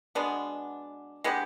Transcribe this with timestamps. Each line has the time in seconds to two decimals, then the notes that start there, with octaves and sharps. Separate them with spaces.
0.15 B2 G#3 B3 D4
1.24 G#3 B3 D4 G4